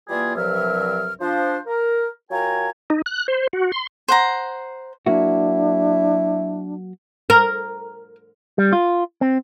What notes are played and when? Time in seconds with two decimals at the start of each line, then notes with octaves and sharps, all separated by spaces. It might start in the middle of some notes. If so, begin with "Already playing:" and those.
0.09 E3 G3 A#3 F4 G#4 D5
0.36 C2 G2 F3 F#3 E5 F6
1.21 F3 D4 C5
1.67 A#4
2.31 F#3 F4 A#4 G5 G#5 A#5
2.90 D#4
3.06 F#6
3.28 C5
3.53 F#4
3.72 C6
4.08 C5 F#5 A#5
5.06 F#3 A#3 D4 E4 F#4
7.30 A#4
8.58 G3
8.73 F4
9.21 C4